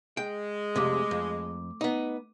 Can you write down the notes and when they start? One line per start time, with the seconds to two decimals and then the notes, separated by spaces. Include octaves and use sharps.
0.17 G#3 G5
0.76 C2 F2 C3 A3 D6
1.11 F2
1.81 B3 D#4